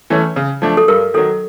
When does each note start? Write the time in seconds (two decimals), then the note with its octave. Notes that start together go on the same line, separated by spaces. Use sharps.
0.10 E3 A3 C#4
0.36 C#3
0.62 F3 A3 D4
0.77 A4
0.88 G2 A#4
1.14 D#3 F#3 A4